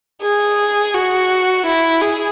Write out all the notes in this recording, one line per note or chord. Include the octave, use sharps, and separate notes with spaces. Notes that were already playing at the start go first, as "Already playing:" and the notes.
G#4
F#4
E4
G#4